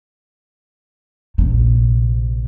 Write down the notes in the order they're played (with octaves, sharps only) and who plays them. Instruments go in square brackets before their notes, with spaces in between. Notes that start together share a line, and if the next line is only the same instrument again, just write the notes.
[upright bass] A#1 C3